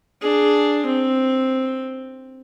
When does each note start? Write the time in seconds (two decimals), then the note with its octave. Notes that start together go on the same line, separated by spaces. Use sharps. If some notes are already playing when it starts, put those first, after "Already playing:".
0.21 D4 G#4
0.86 C4